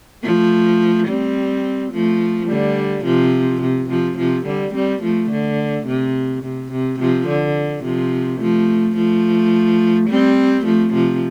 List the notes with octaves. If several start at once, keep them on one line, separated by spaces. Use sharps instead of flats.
F3 A3
G3 C4
F3 A3
D3 G3
C3 F3
C3
C3 F3
C3 F3
D3 G3
G3 C4
F3 A3
D3
C3
C3
C3
C3 F3
D3
C3 F3
F3 A3
F3 A3
G3 C4
F3 A3
C3 F3